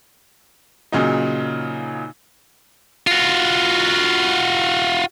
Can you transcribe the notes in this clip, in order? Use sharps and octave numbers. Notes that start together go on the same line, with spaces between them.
A#2 C#3 F#3 D#4
F4 F#4